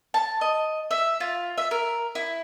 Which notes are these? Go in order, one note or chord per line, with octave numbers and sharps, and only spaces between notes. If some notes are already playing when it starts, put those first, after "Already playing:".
A5
D#5
E5
F4
E5
A#4
E4